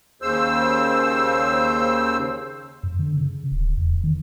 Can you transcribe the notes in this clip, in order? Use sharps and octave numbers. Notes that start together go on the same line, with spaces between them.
D#2 C#3 C5 E6
F#2
D3
C#3
D1
E2
D#3